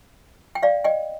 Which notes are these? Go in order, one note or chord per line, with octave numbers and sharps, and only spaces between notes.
G5
D5 F5
D#5 G5